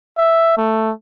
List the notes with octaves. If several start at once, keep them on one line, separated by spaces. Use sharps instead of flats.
E5
A3